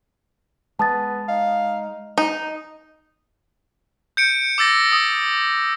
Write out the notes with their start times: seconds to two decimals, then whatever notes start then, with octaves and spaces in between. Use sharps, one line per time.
0.79 G#3 B3 A5 D#6 A6
1.29 D#4 F5
2.18 D#4
4.17 G6 C#7 D7
4.58 D6 E6 A6 A#6
4.92 D#6